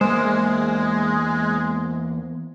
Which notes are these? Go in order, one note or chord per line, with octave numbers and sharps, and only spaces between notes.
E2 G#3 A#3 C5